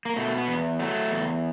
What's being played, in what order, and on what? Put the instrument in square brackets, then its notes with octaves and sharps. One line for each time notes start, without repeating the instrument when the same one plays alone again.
[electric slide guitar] A#3
B2 A3
B3
E2
F#3 A3
E2